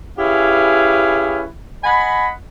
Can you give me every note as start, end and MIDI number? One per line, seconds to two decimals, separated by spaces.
0.19 1.43 61
0.19 1.43 64
0.19 1.43 67
0.19 1.43 68
0.19 1.43 71
0.19 1.43 77
1.84 2.28 75
1.84 2.28 78
1.84 2.28 80
1.84 2.28 83